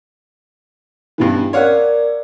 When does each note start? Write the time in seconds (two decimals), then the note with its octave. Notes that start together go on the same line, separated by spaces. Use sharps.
1.18 G2 B2 E3
1.53 A#4 C#5 D5 F5 F#5